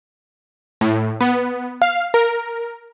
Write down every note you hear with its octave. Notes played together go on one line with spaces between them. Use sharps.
A2
B3
F5
A#4